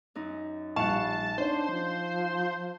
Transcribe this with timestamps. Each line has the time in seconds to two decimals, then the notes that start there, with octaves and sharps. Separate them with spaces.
0.15 F#2 D#4
0.76 A#1 G3 F5 F#5 A5 C#6 E7
1.38 D4 D#4 C5 C#5
1.71 F3